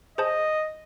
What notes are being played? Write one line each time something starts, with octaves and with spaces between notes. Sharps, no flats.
G#4 C5 D#5 A5